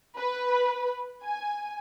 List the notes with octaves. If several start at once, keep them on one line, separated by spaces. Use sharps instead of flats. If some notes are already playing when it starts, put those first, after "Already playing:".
B4
G#5